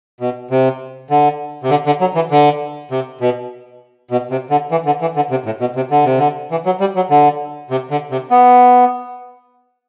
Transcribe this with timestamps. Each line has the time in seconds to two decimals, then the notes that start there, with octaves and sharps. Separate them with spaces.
0.21 B2
0.51 C3
1.10 D3
1.63 C3
1.70 D3
1.86 D3
2.01 F#3
2.15 E3
2.31 D3
2.91 C3
3.21 B2
4.11 B2
4.31 C3
4.50 D3
4.71 E3
4.86 D3
5.01 E3
5.16 D3
5.31 C3
5.46 A2
5.61 B2
5.76 C3
5.91 D3
6.05 C3
6.18 D3
6.51 E3
6.66 F#3
6.80 G3
6.96 F#3
7.10 D3
7.70 C3
7.91 D3
8.11 C3
8.31 B3